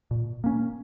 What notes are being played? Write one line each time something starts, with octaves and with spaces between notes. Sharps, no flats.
A#2
A#3 C#4